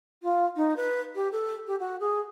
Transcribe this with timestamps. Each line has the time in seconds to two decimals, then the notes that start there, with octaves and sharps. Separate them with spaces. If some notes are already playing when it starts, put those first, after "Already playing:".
0.22 F4
0.56 D#4
0.76 B4
1.15 G4
1.31 A4
1.67 G4
1.79 F#4
2.00 G#4